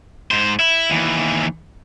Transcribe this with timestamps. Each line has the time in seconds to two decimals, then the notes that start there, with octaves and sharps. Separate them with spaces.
0.31 G#2 C5
0.59 E4
0.90 D#2 E3